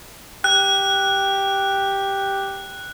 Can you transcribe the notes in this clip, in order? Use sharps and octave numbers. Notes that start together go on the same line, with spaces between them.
G4 F#6